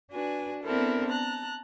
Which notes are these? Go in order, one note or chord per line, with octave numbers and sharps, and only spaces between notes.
D4 F#4 B4 G#5
B3 C4 D4 E4 A4 A#4
A5 A#5 F#6